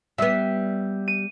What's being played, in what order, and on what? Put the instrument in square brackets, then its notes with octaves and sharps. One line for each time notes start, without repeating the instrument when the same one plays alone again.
[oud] G3 B3 [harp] E5 E6 B6
[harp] D#7